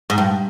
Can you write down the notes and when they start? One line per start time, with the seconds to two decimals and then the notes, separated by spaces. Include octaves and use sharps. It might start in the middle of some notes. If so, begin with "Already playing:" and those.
0.10 G#2
0.18 G2